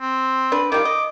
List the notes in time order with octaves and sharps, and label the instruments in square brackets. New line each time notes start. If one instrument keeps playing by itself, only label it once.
[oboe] C4
[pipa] D4 B4
[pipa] D#3 G3 F4 [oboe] D6
[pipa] D#5